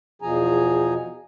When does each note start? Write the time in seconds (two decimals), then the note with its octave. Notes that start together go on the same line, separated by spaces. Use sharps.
0.22 E2 B2 F3 G#4 G#5 A#5